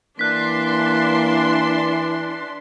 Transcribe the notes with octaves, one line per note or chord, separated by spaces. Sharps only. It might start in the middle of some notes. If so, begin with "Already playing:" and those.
E3 A#3 D4 C6 F#6 B6